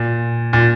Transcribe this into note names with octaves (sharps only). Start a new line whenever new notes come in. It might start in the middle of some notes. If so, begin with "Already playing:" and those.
Already playing: A#2
A#2